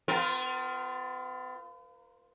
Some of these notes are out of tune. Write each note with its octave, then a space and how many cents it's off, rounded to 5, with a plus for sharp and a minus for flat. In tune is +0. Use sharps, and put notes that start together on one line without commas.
B3 +45 F4 +0 A#4 +0